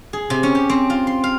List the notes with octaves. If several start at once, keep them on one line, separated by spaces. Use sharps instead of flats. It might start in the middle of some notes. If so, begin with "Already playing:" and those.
G#4
C3
C#4
G4
C4
F4
C6
F5